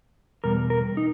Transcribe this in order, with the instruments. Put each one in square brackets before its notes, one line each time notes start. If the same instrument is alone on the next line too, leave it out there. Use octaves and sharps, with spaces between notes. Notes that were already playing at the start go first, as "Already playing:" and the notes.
[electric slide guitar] E2 B2 G3 A#4
A#4
D#4